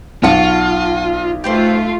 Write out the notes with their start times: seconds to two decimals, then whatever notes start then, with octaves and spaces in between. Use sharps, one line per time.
0.23 B1 F4 F#5 A5 C#6
1.44 A3 F4 G4 B4 C5